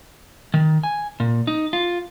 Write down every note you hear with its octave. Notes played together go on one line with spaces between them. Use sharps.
D#3
G#5
A#2
D#4
F4